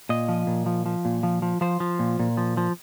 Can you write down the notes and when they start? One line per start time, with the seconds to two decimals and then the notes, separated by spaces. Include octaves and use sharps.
0.09 A#2 D#5
0.29 F3
0.47 A#2
0.66 F3
0.86 F3
1.05 A#2
1.23 F3
1.42 F3
1.61 F3 C5
1.80 F3
1.99 A#2
2.19 A#2
2.37 F3
2.57 F3